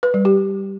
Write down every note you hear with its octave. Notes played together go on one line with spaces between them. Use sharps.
B4
G3
G4